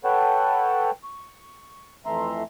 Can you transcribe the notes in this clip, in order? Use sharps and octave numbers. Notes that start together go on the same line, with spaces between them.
A4 B4 C#5 F#5 G5 A5
C#6
F2 E3 A3 E5 A#5 C6